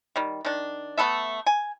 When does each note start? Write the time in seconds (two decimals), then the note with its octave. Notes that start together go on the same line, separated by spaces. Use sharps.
0.16 D#3 G3
0.45 D#3 D4
0.97 A3 B3 A4 E5
1.46 G#5